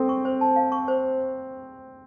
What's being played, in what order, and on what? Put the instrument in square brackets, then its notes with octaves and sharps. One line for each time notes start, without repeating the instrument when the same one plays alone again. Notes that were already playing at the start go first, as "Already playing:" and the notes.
Already playing: [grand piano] C4 [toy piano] A4
[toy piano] C#6
C5
A5
F5
C#6
C5